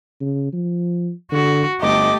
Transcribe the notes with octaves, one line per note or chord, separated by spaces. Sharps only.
C#3
F3
D3 F#4
G1 A3 G4 D#5 D6